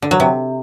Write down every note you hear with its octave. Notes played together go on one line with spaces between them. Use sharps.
D3
F#3
C3